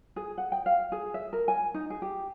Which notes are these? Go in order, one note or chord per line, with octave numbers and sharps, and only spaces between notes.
G#4
F#5
G5
F5
G#4
E5
A#4
G#5
D#4
G#4
G4